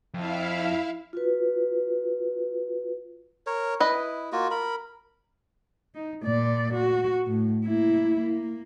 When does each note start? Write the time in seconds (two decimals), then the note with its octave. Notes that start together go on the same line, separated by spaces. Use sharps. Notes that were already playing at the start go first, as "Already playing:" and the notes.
0.14 F2 E4 E5 F5
1.13 F4 F#4 B4
3.47 A#4 C#5
3.80 E4 B4 D#5
4.32 A#3 F4 F#4
4.51 A#4 B5
5.95 D#4
6.24 A#2 D5
6.74 F#4
7.27 A2
7.66 A#3 E4
8.19 A#3